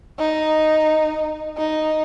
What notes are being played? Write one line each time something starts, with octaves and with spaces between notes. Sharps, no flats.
D#4
D#4